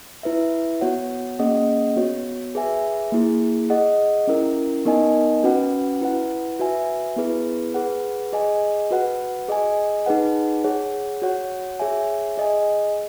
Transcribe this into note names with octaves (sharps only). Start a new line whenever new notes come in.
E4 B4 E5
B3 F#4 C#5 F#5
A#3 C#4 G#4 D#5 F#5
B3 F#4 C#5
G#4 B4 E5 G#5
A#3 E4 G#4
G#4 D#5 F#5
C#4 E4 A#4
B3 D#4 A#4 D#5 G#5
C#4 F#4 B4 F#5
E4 B4 F#5
F#4 B4 E5 G#5
B3 E4 G#4 B4
G#4 B4 F#5
G#4 D#5 G#5
F#4 B4 F#5
G#4 D#5 G#5
D#4 G#4 B4 F#5
G#4 C#5 F#5
F#4 C#5 F#5
G#4 C#5 E5 G#5
G#4 D#5 G#5